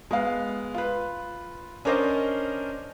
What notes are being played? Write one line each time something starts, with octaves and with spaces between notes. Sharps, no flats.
G#3 B3 F5
F4 B4
C#4 D4 A#4 C5 D5 D#5